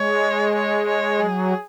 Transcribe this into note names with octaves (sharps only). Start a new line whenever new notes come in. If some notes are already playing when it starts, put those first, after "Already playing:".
Already playing: G#3 C#5
C#5
C#5
F#3 G#4